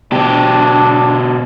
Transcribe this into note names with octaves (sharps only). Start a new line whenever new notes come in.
B2 D4 G4